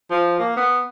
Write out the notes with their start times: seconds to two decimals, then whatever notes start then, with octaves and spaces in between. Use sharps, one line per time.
0.11 F3
0.39 A#3
0.57 B3